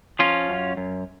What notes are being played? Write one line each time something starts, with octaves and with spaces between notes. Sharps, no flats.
F3 C#4 F4
F#2
F#2